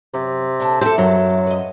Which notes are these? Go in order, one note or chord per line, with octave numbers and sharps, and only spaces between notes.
F#2 C3
D4 A4
E4 G4 A4 C5 E5
F#2 F#3
B4 D#5